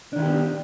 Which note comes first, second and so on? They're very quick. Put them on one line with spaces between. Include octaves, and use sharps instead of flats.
D4 D#3 E4 G4 B3